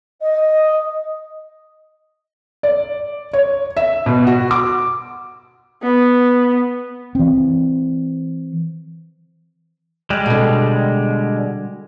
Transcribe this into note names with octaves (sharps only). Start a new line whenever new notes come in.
D#5
D5
C#5
E5
B2
F#4
D6
B3
E3 C4
G3 G#3
B2 D3